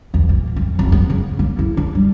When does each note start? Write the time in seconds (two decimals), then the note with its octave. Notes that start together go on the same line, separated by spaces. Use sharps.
0.14 E2
0.29 A#2
0.56 F2
0.79 F1
0.92 B3
1.10 C#3
1.39 A#3
1.59 E4
1.77 D4
1.95 G3